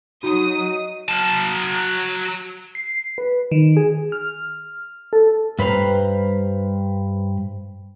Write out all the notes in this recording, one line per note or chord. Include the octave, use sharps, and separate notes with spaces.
F#3 D#4 F#4 D#6
F#3 A5
C7
B4
D#3
G#4
F6
A4
G2 B4 C5 A#5